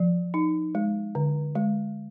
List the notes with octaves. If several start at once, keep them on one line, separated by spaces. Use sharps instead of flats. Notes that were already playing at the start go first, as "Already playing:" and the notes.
Already playing: F3
D#4
G#3
D3
G#3